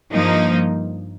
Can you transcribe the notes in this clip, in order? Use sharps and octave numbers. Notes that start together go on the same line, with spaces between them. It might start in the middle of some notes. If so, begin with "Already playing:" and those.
G2 F3 A#3 D#4